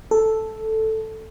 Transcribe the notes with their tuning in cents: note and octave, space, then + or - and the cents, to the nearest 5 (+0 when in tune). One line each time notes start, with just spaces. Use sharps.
A4 +0